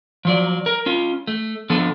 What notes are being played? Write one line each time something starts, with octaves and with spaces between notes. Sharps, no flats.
F3 F#3 D5
A#4
C#4 F4
A3
D3 F3 B3 A4